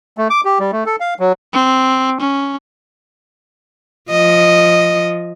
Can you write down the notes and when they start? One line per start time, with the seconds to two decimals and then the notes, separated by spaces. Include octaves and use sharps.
0.18 A3
0.30 D6
0.45 G4
0.59 G3
0.72 A3
0.86 A4
1.00 F5
1.20 F#3
1.53 C4
2.20 C#4
4.10 F3 D#5